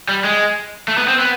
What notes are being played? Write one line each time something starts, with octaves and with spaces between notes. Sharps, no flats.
G3
G#3
A3
B3
C4
B3